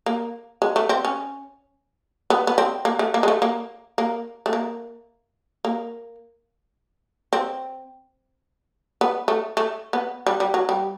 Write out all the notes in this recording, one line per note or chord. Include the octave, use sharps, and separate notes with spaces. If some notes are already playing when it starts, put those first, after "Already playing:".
A#3
G#3
A3
C4
C#4
B3
B3
C4
A#3
A3
A#3
G#3
A3
A#3
A#3
A3
A#3
A#3
C4
B3
A3
A3
B3
G3
G3
F#3
G3